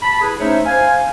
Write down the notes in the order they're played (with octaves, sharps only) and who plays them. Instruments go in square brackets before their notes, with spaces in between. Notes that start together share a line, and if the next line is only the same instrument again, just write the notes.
[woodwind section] A5 B5
E4 G#4 B4
A3 C#4 D#4 C5 C#5 E5
C5 F5 G#5